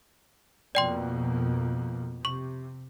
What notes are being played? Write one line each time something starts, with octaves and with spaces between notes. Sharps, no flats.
F2 B2 A#3 D5 G5 C6
C3 C#6